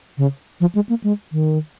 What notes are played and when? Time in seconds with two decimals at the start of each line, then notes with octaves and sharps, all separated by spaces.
0.18 C#3
0.61 F3
0.75 G#3
0.89 A#3
1.04 G#3
1.32 D#3